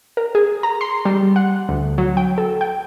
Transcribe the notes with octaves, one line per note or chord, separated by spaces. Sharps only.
A#4
G#4
A#5
C6
G3
F#5
D2
F#3
G5
A4
G5